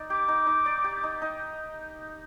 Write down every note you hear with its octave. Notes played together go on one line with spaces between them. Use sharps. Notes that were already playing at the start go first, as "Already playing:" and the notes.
Already playing: D#4 D5
G4 D6
D#4
D#4
D5
G4
D#4
D#4